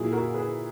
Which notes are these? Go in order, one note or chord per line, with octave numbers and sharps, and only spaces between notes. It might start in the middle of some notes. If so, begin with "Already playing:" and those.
Already playing: A#2 F#3 E4 G#4
F#4 A#4
G#4 B4